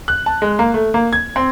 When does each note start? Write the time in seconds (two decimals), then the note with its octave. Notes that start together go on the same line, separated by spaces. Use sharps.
0.08 F#6
0.26 A5
0.42 G#3
0.59 A#3
0.74 A3
0.94 A#3
1.13 G#6
1.36 C4